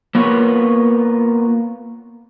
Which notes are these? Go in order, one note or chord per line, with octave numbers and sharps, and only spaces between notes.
A#3 B3 F4 B4 C#5